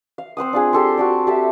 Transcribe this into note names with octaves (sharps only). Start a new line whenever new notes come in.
F5
C4 C5 F#5 D#6
D4 F4 G#4
G4 A4 C6
F#4 A4 D5
G4 A4 E5